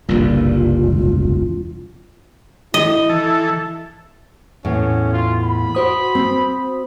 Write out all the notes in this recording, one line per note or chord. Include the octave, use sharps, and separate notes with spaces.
F#1 C2 G2 A#2 F4
E1
E4 D#5
E3 A4
E2 A2 C#4
F4
B5
F#4 C5 D#6
C4